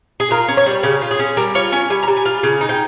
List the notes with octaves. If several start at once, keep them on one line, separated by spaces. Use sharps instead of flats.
G#4
F4 A#4
C#4
C#5
G3
C#3 G4
F4
G#4
C#4
G3 A#4
F4 C#5
C#4 G#5
G3 G#5
A#5
G3
G#5
F4
C#3
D#4
G5